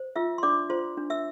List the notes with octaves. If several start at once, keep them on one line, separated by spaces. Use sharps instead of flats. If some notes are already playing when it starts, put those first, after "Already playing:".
Already playing: C5
F4 E5 E6
C6
D4 D5 D6
F4 C5 C6
D4
E5 E6